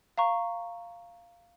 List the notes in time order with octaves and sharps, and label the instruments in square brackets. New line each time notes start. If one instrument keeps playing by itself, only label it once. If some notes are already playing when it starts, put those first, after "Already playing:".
[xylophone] F5 A#5 C#6